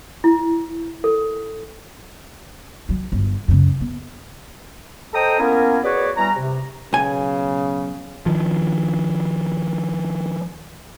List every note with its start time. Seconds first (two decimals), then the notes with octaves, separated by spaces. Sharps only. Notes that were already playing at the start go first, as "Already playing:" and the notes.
0.24 E4
1.04 A4
2.89 F#3
3.12 G1
3.48 F#2 C#3
3.81 B3
5.14 A4 C5 D#5 G5 A#5 D#6
5.39 A#3 B3 C#4 E4 A#4
5.83 B3 F#4 G#4 B4 C#5 D5
6.17 E3 G3 B3 A#5
6.36 C3
6.93 B1 C#3 G#5
8.26 D#3 F3